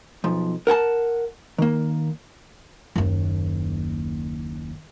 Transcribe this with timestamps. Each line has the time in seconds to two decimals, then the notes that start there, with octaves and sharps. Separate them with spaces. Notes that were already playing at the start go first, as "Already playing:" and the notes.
0.24 B1 F3
0.67 A#4 F#5 G#5 A5
1.58 D#3 A#3
2.96 F#1 D#2